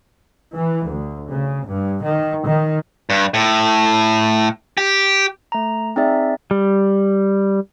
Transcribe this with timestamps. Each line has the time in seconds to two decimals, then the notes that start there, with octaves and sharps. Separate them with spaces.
0.54 E3
0.89 D2
1.31 C#3
1.66 G2
2.04 D#3
2.46 D#3
3.10 G2
3.34 A2
4.78 G4
5.52 A3 A#5
5.96 C4 D#4 G#4 D5 E5
6.51 G3